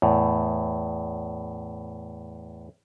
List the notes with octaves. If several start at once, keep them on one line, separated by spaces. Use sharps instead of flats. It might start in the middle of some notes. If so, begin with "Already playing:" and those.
E2 A2